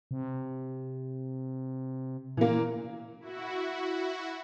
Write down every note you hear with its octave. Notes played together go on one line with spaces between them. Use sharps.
C3
A#2 E3 A#3
E4 F#4